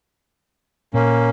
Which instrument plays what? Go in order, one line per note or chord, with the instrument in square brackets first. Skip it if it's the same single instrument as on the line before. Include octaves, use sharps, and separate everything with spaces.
[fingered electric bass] A#2 [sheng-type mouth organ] A#3 C#4